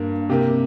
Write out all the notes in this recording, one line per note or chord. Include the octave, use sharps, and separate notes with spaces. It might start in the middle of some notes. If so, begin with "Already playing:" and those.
Already playing: G2 A#3
C3 A#3 G4